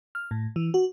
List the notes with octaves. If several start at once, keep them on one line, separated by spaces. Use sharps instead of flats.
F6
A2
E3
F#4